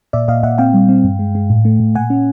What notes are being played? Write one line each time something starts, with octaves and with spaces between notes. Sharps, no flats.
A#2 D5 E5
A#2 D#5 F5
A#2 E5 F#5
C4 F5 G5
G3
C4
G2
G#3
G#3
A2
A3
A2
A#2 F#5 G#5
C#4